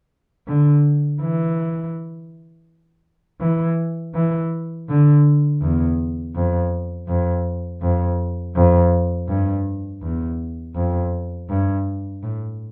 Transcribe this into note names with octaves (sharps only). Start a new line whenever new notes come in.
D3
E3
E3
E3
D3
E2
F2
F2
F2
F2
G2
E2
F2
G2
A2